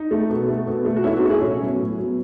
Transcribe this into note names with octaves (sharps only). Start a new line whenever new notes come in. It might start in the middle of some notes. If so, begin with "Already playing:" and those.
Already playing: D#4
A3
B2
A3
B2
A3
F#4
B2 C#4 E4
D#4 F#4
A3 A4
E4 G#4
A2 C#4
F#3 B3
A2
F#3 B3